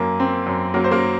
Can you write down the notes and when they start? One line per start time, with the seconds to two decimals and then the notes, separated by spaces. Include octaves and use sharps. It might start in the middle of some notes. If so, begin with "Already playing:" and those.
Already playing: F#2 A#3
0.20 C4
0.47 F#2
0.74 F#3 A#3 A#4
0.84 C5
0.91 A#3 A#4